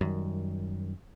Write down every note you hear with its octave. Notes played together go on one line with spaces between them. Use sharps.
F#2 D#3 G3